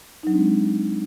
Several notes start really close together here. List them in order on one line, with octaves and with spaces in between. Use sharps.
D#4 F#3 D4 C4 G#3